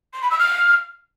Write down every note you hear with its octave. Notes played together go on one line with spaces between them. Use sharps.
C6
B5
E6
F6